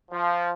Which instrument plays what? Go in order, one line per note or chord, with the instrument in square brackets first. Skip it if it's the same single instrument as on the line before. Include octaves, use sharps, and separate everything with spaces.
[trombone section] F3